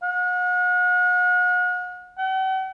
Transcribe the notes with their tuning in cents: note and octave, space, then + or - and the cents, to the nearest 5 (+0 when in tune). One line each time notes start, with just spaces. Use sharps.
F#5 -40
F#5 +45